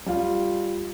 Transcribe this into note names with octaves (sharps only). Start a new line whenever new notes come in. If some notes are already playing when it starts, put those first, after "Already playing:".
G3 F4